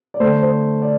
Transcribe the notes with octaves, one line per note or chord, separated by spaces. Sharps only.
D5
D3 A3 C5
C5
D5